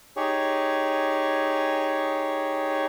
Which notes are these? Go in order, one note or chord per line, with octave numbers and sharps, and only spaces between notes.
D#4 G4 G#4 C#5